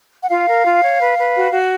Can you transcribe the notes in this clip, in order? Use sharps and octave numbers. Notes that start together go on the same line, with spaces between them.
F#5
F4 F5
A#4
F4
C#5
B4
B4
F#4
F#4